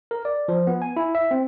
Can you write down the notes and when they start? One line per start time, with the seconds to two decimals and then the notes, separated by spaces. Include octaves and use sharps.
0.11 A#4
0.25 D5
0.48 F3
0.67 B3
0.82 G#5
0.96 E4
1.15 E5
1.31 C4